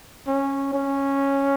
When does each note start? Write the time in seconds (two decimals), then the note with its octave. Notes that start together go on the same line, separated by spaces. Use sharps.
0.27 C#4
0.73 C#4